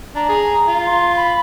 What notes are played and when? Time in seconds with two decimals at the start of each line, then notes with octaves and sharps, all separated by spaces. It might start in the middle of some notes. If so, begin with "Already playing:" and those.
0.15 D4 A#5
0.29 G#4
0.67 F4
0.86 C6
1.16 B5